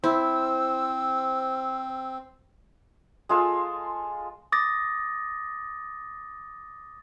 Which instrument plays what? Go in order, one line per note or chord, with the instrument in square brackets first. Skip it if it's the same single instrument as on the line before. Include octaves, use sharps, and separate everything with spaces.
[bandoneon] C4 [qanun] E4 [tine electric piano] C5 [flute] E6
[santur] G#3 F4 A4 C6
[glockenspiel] D6 D#6 A6 A#6